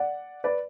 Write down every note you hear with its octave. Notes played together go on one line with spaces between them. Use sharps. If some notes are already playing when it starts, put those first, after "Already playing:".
Already playing: D5 F#5
B4 D5